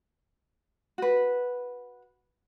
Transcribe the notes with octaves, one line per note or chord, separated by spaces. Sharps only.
F#4 B4